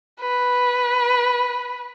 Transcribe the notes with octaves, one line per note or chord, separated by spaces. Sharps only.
B4